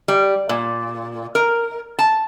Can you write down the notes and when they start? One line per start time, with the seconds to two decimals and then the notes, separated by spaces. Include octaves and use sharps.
0.08 G3
0.49 A#2
1.35 A#4
1.99 A5